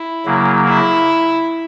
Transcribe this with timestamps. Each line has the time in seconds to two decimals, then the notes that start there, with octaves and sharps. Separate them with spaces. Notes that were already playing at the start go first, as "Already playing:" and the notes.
Already playing: E4
0.25 C#3 F#3 A#3
0.65 E4